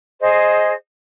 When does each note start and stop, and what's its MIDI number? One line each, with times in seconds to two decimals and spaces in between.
0.20 0.72 68
0.20 0.72 72
0.20 0.72 75